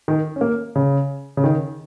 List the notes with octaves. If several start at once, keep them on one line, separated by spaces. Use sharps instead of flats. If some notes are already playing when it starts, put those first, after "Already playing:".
D#3
C#4
A#3
C#3
C#3
D#3